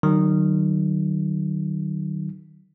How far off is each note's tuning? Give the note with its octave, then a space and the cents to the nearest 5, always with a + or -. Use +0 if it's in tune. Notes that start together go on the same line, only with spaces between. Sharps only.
D#3 -25 F#3 +30